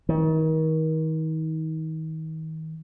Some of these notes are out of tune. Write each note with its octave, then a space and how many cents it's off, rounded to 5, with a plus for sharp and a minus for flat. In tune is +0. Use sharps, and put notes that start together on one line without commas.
D#3 +35